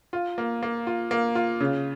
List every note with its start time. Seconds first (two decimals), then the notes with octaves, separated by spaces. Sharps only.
0.13 F4
0.38 A#3
0.63 A#3
0.87 F4
1.11 A#3
1.35 F4
1.60 C#3